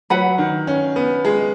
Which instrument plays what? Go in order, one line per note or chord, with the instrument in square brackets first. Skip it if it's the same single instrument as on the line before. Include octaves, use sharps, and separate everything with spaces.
[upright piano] F#3 [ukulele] B4 F#5 B5
[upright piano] D#3
C#4
B3
G#3